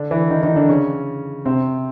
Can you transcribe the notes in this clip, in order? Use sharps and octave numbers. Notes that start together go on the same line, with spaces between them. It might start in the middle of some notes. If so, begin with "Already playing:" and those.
Already playing: D3 D4
E3 E4
D#3 D#4
D#3 D#4
D3 D4
C#3 C#4
C3 C4